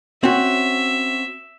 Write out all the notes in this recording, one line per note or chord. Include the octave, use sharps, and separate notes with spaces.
C4 C#4 F#4 E5